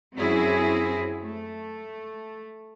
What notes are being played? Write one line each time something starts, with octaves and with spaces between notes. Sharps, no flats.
F#2 C4 C#4 E4 F#4 G#4
A3